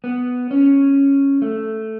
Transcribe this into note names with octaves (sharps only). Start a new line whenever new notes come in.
B3
C#4
A3